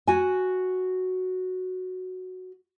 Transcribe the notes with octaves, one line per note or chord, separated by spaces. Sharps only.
F#4 G#5